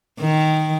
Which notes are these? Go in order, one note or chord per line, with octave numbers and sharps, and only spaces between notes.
D#3